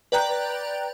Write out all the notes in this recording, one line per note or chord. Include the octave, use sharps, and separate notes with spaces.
B4 D5 G5 A#5 F#6 G6